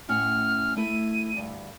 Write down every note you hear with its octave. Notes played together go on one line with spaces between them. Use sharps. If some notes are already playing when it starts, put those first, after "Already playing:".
A2 C#4 F#5 F6
A3 E4 D#7
D2 G2